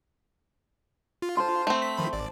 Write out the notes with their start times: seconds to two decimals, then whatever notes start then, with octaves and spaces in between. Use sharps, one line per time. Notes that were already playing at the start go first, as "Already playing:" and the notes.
1.22 F4
1.37 C5 A5 C6
1.67 A3 C4
1.82 B6
1.97 D#3 F3 B5
2.13 G#1 D5